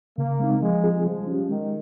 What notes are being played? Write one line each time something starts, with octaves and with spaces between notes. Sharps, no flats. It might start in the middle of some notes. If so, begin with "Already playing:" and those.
C#3 A#3
G#3 C4 D#4
F3 G#3
C4 F4 G#4
F3 G3
C#4 G4
D#3 G#3